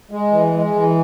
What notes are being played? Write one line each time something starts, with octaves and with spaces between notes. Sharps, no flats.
G#3
E3
G#3
E3